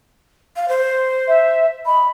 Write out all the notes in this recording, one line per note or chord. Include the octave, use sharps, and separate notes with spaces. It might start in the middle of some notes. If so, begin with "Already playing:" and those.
F5
C5
E5
D#5 B5